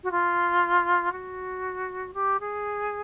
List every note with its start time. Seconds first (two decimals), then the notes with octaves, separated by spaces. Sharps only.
0.03 F#4
0.12 F4
1.12 F#4
2.14 G4
2.40 G#4